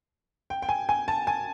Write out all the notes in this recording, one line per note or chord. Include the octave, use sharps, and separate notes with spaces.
G5
G5
G#5
G#5
A5
G#5